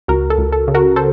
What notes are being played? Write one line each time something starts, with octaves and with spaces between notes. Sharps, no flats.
C#2 F#4 A#4
A4
C#2
A4
C#3
F#4 A#4
A4 C5